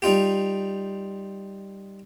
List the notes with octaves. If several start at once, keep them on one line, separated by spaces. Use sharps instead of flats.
G3 D#4 F4 G4